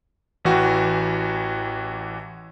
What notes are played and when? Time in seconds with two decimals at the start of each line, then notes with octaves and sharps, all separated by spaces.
0.45 A1 E3 F#4 G5